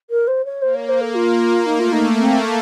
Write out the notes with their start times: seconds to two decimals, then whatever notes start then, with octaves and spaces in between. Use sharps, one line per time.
0.10 A#4
0.27 C5
0.45 C#5
0.62 A#3 C5
0.75 C#5
0.89 C5
1.01 A4
1.15 F4
1.66 A3 D#4
1.79 F4
1.92 D#4
2.18 C4